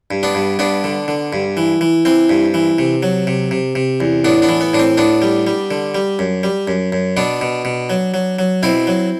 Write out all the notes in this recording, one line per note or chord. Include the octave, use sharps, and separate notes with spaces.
G2
B3 D4
G2
G2 B3 D4
D3
D3
G2
E3
E3
E3 C4
G2
E3
C3
F#3
C3
C3
C3
E2
A2 B3 D4
B3 D4
E3
B3
A2 D4
C4
A2 B3 D4
G3
G3
D3
G3
F#2
G3
F#2
F#2
B2 B3 D4
B2
B2
F#3
F#3
F#3
B2 C4 E4
F#3